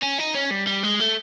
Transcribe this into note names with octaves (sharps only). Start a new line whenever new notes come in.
C#4
D#4
C#4
G3
G3
G#3
A3